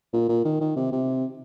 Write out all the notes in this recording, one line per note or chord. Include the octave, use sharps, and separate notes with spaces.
A#2
A#2
D#3
D#3
C3
C3